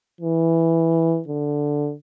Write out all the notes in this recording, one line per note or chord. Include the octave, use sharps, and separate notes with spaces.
E3
D3